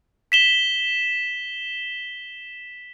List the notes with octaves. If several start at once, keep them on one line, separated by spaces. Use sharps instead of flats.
B6 E7 G7